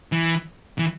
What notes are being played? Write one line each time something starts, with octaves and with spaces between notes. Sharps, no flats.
E3
E3